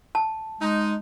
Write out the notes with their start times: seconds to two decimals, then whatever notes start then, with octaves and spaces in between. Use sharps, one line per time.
0.15 A5
0.61 G#3 D#4